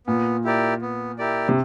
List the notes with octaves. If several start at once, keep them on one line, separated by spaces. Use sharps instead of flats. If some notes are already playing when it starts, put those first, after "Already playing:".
A#2 B3
E4 G4 A#4 D5
B3
E4 G4 A#4 D5
C3